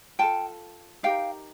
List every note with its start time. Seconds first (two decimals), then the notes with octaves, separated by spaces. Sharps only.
0.19 F4 A4 G5 A5
1.03 D#4 G4 A#4 F5 G5